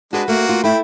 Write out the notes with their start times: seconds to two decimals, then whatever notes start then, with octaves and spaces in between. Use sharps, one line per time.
0.13 G#3 D4 F#4 B4
0.28 A3 A#3 F#4
0.49 F4
0.64 A3 E4 G5 B5